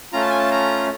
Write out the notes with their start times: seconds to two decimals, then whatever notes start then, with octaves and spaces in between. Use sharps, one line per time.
0.13 A3 C#4 F4 A#5
0.21 A5
0.30 G#5
0.38 A5
0.51 A#5